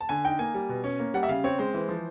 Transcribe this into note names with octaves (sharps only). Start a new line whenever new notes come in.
A5
D3 G#5
D#4 G5
A#3 G#5
G3
B2
C#4
A#3
G3 F#5
E5
C#3 F5
C4 C#5
G#3 C5
E3
F3